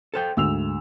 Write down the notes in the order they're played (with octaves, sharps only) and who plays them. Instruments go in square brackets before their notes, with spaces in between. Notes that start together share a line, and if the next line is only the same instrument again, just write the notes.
[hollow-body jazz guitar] A4 C5 G5
[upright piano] D2 E6 F7 [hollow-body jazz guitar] G#2